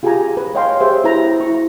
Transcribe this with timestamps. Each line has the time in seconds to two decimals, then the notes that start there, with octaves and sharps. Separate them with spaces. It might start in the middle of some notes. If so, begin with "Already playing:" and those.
0.03 F4 G4 G#4 G5 G#5 A#5
0.37 B4
0.55 C#5 D#5 F5 G5 G#5 C6
0.80 G4 G#4 B4 C5 E5 G5
1.04 E4 F#4 G4 B4 A#5
1.40 E4 C#6